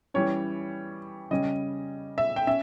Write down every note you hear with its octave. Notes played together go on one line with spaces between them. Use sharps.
E3 G3 C#4 C#5
C#3 G3 C#4 D#5
E5
G5
C#4 E5